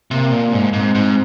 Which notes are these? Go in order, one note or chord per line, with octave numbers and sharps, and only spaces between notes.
C3 A#3
A#2
G#2
G#2 C4
G#2